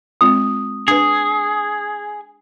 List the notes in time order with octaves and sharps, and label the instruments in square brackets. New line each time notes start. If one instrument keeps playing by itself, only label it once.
[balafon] G#3 C4 F4 [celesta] D#6
[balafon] D4 B4 [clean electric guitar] G#4